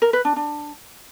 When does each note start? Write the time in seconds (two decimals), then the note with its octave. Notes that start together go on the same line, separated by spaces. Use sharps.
0.02 A#4
0.13 B4
0.25 D4
0.36 D4